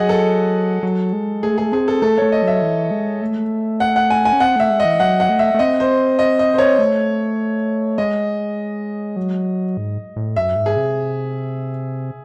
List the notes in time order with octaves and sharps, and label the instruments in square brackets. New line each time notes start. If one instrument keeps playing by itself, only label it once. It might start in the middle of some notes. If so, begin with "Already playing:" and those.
Already playing: [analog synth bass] F#3 [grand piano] G#4 D#5 F#5
[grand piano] A4
[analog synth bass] F#3
G#3
[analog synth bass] A3 [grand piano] G#4
[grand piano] G#4
[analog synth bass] C4 [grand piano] G#4
[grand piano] A4
[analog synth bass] A3 [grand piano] A4
[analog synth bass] A3 [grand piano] C#5
[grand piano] D#5
[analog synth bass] F#3 [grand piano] E5
[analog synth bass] E3
G#3
A3
[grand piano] F#5
F#5
G#5
G#5
[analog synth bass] C#4
[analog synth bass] C4 [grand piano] F#5
[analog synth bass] A3 [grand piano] E5
[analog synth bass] G#3
[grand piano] D#5
[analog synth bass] E3
[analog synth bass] F#3 [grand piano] F#5
[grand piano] F#5
[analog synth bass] A3
[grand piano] E5
[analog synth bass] A3
[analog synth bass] C4 [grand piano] D#5
[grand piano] C5
D#5
D#5
C5
C#5
[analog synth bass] A3
[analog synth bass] G#3 [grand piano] D#5
[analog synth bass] F#3
G#2
A2
[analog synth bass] F#2 [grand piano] E5
[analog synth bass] G#2
[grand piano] G#4
[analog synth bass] C3